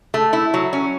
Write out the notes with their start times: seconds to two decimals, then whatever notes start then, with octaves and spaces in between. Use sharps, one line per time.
0.14 A3
0.33 E4
0.54 F#3
0.73 C#4